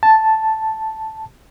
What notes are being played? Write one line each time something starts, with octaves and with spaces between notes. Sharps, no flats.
A5